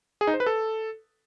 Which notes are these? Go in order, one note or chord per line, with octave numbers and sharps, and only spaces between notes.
G#4
D#4
C5
B4
A4